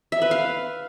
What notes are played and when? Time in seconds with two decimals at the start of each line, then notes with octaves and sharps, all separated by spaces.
0.12 E5
0.22 B4
0.31 F5